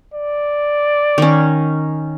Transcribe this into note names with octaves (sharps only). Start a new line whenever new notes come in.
D5
D#3 C#4